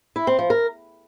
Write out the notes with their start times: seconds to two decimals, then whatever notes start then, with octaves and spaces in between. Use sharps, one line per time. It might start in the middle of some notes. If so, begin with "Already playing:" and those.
0.16 E4
0.27 C4
0.39 F3
0.50 A#4